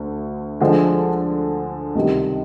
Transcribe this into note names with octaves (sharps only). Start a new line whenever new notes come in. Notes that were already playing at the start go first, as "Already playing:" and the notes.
Already playing: D2 D3
D3 F3 G#3
C#2 C3 D#3 G3